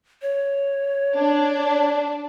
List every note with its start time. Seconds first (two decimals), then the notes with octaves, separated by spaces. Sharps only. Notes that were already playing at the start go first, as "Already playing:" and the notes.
0.22 C#5
1.17 D4